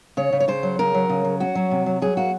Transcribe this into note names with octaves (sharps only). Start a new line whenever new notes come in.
C#3 C#5
C#3
C#5
C#3 C5
F#3
C#3 A#4
F#3
C#3
F#3
C#4 F#4
F#3
C3
F#3
F#3 G#4
A#3 F#4